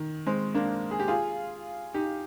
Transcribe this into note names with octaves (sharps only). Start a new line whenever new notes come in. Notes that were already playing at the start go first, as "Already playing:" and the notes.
Already playing: D#3
G#3 C4
A#3 D4
G#4
G4
F4 G#4
D#4 G4